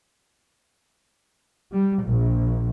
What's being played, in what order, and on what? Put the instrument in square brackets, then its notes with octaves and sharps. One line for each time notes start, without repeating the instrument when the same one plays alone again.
[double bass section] G3
A#1